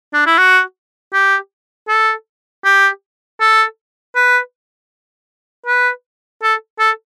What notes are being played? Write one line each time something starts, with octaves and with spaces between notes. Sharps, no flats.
D4
E4
F#4
G4
A4
G4
A4
B4
B4
A4
A4